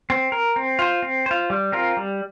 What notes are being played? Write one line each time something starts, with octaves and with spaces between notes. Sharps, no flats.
C4
A#4
C4
F4 C5
C4
F4 C5
G3
C4 F4 A#4
G3